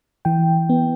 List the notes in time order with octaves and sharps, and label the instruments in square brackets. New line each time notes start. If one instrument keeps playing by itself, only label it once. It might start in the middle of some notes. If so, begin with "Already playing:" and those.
[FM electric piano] E3 G5
B3